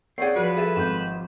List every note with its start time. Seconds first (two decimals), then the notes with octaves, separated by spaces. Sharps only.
0.18 C4 D#4 G#4 C#5 D5 F#5 C7
0.36 F3 G3 F#4 B4
0.57 G#4 A4 E5
0.76 G#1 G6 E7